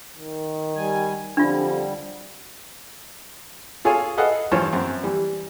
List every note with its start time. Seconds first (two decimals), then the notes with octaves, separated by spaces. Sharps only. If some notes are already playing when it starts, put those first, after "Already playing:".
0.16 D#3
0.76 G3 G#5
1.37 F2 D3 G3 D4 F4
3.85 F4 G#4 A4 C#5 F5 G#5
4.17 G#4 A4 B4 D#5 F5 F#5
4.52 G2 E3 F4 C5 C#5 A5
4.73 F#2 C4
5.03 E3 G3